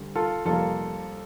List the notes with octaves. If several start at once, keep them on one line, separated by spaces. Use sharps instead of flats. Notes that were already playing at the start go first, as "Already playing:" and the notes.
Already playing: D2 D3 G3
F4 A4
F1 F2 D#3 G3 A#3 F4 A4